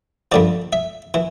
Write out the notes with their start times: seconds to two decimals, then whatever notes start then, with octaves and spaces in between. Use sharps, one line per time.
0.32 G2 D3 F3 D5
0.73 E5
1.14 E3